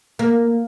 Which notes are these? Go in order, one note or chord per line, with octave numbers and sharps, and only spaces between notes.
A#3